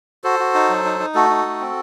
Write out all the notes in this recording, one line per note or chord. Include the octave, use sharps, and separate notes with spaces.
F#4 A4 C5
F#4
D#4
F#3
D#4
D#4
A3 F#4 A4
D#4
A3
C4